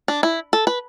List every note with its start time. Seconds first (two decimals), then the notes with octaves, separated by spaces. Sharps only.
0.08 D4
0.23 E4
0.53 A4
0.67 B4